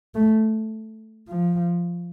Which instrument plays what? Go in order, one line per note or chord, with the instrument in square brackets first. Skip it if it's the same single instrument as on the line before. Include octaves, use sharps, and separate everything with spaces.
[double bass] A3
F3